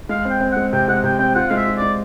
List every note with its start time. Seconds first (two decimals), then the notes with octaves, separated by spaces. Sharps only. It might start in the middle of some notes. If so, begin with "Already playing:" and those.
0.09 G#3 F5
0.25 C4
0.30 G5
0.41 C4
0.52 G#3 F#5
0.73 C3 G5
0.88 G#3 F#5
1.04 C3 G5
1.19 C4 G5
1.35 F4 F#5
1.49 G#3 F5
1.56 E5
1.67 F4
1.77 G#3 D5